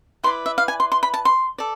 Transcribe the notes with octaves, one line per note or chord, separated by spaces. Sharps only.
E4 B4 D5 C6
E5
F5
G#5
C6
C6
B5
A5
C6
A4 D5